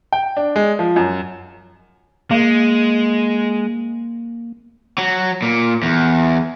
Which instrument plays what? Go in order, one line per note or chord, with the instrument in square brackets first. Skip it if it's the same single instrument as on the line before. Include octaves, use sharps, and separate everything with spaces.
[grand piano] G5
D4
G#3
F3
F#2
[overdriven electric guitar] G#3 [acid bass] A#3
[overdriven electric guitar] F#3
A#2
E2